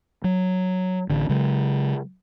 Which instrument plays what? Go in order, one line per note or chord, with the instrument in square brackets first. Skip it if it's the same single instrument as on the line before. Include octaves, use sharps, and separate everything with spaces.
[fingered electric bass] F#3
A1 D3
C#3 F#3 G#3